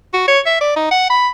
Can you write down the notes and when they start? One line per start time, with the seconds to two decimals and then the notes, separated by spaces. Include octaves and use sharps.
0.13 F#4
0.28 C#5
0.46 E5
0.61 D5
0.76 D#4
0.91 F#5
1.10 B5